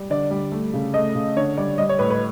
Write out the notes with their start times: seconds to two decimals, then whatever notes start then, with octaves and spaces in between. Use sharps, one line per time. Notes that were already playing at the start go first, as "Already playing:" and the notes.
Already playing: G3
0.10 D3 D5
0.31 G3
0.52 A3
0.74 C#3
0.94 A3 D#5
1.15 C#3
1.36 D3 C#5
1.57 G3 D5
1.78 G3 D#5
1.89 C#5
1.99 A2 B4
2.10 B4